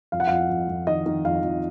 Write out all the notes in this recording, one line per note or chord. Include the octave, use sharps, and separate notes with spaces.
F2 F5
F#5
F2 F5
F2
F2
D#3 D#5
D#3
F2 F5
F2